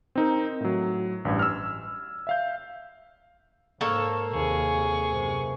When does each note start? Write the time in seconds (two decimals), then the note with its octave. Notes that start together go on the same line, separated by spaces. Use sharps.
0.15 C4 D#4 A#4
0.60 A2 F#3
1.25 A1 G2 G#6
1.39 E6 F6
2.27 E5 F5 G6
3.81 G#2 A#3 A4 C#5
4.33 D#2 C3 G#4 C#6
5.09 F#2 C3